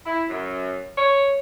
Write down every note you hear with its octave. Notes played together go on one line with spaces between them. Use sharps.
E4
F#2
C#5